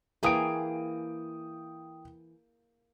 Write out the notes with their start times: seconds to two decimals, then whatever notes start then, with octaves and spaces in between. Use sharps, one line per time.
0.23 E3 A#3 G#4 G5 D#6 D7